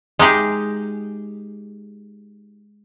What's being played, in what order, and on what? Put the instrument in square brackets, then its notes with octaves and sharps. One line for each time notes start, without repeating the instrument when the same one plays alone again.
[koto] G#3 D#4 G4 G#4